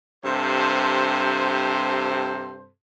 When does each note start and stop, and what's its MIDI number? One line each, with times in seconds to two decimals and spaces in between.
0.25 2.69 43
0.25 2.69 48
0.25 2.69 69
0.25 2.69 72